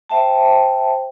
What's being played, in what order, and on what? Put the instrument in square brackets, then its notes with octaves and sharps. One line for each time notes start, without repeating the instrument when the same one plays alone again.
[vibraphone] C5 E5 G5 A5